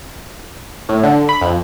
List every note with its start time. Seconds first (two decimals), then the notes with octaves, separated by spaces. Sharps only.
0.89 A2
1.03 D3
1.29 B5
1.41 F2